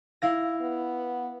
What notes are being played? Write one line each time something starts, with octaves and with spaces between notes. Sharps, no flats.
E4 F5 A#6
B3